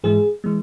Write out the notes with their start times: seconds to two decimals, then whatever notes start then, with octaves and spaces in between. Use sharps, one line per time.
0.04 G#2 E3 G#3 G#4
0.44 E3 G#3